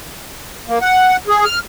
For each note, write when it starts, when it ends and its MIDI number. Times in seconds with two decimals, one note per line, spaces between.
0.68 0.79 58
0.81 1.16 78
1.28 1.45 68
1.45 1.59 89